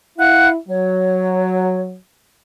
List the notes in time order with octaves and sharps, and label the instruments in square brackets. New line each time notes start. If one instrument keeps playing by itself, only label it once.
[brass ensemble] E4 [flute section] F5 F#5 F#6
[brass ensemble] F#3 [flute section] C#5